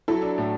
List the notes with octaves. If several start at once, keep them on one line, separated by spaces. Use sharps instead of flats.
F#3 E4 A4
D4
A2